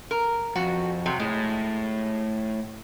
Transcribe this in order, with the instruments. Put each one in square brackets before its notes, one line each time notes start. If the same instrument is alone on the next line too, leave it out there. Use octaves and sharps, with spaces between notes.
[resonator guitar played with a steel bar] A#4
[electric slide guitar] F2 [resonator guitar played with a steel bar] F#4
[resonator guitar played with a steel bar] C3 F#3
[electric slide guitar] A2 [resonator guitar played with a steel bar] G#3